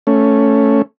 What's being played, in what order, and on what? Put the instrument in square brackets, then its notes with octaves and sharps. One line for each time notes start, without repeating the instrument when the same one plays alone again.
[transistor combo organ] A3 C#4